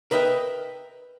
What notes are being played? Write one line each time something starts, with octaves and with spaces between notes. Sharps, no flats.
A#4 B4 D#5 E5 G5